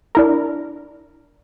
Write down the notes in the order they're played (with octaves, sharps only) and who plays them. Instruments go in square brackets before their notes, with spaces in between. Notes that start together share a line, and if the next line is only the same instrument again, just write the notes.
[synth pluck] D4 E4 A#4